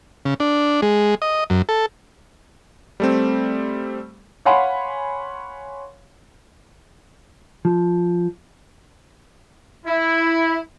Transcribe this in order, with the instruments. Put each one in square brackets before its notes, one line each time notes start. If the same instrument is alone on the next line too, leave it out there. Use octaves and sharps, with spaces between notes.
[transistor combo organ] C#3
D4
G#3
D#5
F#2
A4
[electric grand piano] G3 A3 C4
[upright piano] C#5 F5 F#5 G#5 B5 C6
[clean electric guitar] F3
[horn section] E4